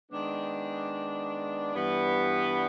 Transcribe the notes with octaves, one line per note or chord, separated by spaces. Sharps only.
D#3 G#3 B3 D4
G2 E3 G3 B3